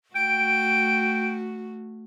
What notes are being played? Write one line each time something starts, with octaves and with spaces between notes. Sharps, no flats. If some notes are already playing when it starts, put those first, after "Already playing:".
A3 F#4 G5 D7